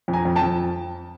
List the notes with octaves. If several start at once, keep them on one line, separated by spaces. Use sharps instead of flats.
F2
G#5 A#5
F2
G5 A5
F2